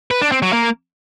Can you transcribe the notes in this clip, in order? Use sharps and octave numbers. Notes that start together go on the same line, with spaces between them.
B4
D4
C4
F#3
A#3